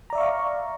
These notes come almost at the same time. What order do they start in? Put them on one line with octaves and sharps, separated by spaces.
A#5 D5 E5 C#6 F5